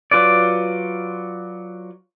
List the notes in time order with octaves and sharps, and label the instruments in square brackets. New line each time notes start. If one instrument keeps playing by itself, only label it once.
[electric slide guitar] F#3 F4 B4 D5